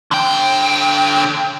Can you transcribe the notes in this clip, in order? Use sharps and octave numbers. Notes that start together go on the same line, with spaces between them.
D3 G5